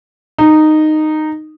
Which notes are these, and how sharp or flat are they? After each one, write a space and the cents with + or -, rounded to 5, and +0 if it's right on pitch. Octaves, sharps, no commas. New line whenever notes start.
D#4 -10